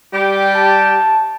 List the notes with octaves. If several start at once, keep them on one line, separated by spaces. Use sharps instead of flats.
G3 G4
A5